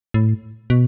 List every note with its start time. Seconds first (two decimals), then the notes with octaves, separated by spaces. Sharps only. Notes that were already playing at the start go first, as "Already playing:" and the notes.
0.14 A2
0.70 B2